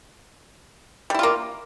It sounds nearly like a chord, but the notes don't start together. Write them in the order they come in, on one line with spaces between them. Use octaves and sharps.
G3 E4 F4 A#3